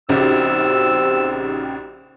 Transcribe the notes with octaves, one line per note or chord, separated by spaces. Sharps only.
A#1 C#3 C4 D#4 F#4 G4 E6